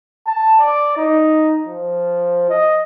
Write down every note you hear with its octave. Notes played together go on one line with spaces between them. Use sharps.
A5
D5
D#4
F3
D#5